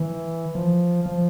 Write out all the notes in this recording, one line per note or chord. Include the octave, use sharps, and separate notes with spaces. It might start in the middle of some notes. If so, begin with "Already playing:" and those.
Already playing: E3
F3
F3